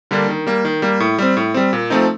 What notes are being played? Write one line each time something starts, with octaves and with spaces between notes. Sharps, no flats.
D3 G3 A#3 D4
D#3
G3 A#3
D#3
G3 A#3
A2
G3 C4
A2
G3 C4
A#2
F3 A3 C4 D#4